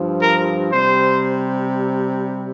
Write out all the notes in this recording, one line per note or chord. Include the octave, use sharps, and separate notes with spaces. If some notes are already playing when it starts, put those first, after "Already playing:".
Already playing: G2 F3
A#4
C3 G3 C5